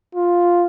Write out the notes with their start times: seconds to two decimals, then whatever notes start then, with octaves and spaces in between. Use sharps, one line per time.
0.15 F4